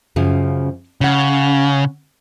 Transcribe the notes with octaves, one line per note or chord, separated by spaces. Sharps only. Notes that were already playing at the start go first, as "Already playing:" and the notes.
F#2 C#3 F3
C#3 C#4 F#5